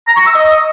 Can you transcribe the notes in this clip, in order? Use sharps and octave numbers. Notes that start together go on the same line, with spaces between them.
A#5
C#6
E6
D#5